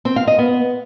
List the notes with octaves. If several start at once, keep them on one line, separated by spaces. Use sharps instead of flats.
C4
F5
D#5
B3